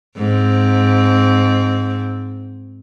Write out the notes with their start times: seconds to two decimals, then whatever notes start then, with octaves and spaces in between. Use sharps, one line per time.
0.17 G#2 C4